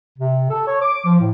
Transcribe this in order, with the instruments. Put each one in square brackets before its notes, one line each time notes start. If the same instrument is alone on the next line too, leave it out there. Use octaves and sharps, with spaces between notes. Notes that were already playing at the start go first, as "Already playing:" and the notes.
[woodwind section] C3
A4
C#5
D6
F3
A2